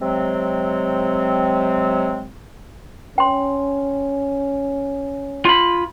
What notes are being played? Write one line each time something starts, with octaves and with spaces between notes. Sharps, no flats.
C3 F#3 G#3 C4
C#4 G5 C6
F4 B5